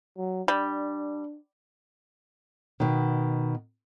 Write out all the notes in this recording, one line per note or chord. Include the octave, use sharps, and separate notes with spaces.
F#3
G3 D4
B2 D#3